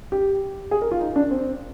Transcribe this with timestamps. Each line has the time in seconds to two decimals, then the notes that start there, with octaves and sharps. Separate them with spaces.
0.12 G4
0.71 G#4
0.82 A#4
0.91 F4
1.01 D#4
1.16 D4
1.31 C4